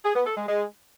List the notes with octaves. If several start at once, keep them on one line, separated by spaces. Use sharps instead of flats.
G#4
B3
A4
G#3
G#3